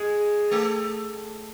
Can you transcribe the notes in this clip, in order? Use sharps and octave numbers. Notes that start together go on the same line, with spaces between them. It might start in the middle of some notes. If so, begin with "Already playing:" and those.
Already playing: G#3 G#4
A3 A4